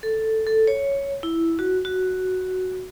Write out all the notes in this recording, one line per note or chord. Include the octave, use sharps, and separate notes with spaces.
A4
A4
C#5
E4
F#4
F#4